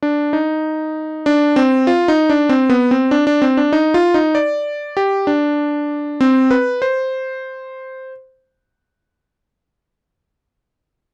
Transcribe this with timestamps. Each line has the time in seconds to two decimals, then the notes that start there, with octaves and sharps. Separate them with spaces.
0.03 D4
0.33 D#4
1.26 D4
1.56 C4
1.87 F4
2.08 D#4
2.30 D4
2.49 C4
2.70 B3
2.91 C4
3.11 D4
3.27 D4
3.42 C4
3.57 D4
3.73 D#4
3.94 F4
4.14 D#4
4.35 D5
4.97 G4
5.27 D4
6.21 C4
6.51 B4
6.82 C5